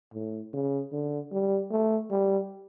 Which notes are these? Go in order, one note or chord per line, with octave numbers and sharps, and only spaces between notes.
A2
C#3
D3
G3
A3
G3